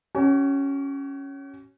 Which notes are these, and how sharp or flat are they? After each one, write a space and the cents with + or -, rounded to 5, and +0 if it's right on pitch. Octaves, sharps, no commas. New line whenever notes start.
C#4 +0 F#4 +45